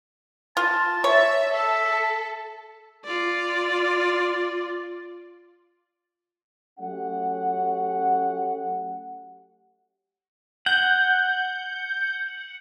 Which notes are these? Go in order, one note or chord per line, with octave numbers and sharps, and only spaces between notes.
F4 A5
C#5 E5
A4 E5
F4 D5
F#3 A3 C#4 G4 F#5
F#5 G6